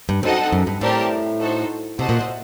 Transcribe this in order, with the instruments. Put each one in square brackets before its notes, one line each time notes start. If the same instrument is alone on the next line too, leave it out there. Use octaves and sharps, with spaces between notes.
[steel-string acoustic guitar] G2
[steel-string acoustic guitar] F#2 [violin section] C4 D#4 A4 D#5 F#5
[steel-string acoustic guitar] F#2
G2
[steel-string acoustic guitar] A2 [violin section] C4 G4 A#4 D5 A5
[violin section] D#4 F#4 A4 C5
[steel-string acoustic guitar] C3 [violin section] F#4 C5 D#5 F#5 A5
[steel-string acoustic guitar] A#2
A2